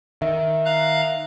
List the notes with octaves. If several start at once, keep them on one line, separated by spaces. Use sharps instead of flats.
D#3 E5
F5 A#5 F#6